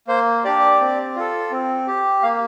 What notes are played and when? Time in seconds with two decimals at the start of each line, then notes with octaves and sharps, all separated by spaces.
0.08 A#3 C5
0.44 D4 G4 D5
0.80 C4
1.16 F4 A4
1.51 C4
1.87 G4
2.23 A#3 F5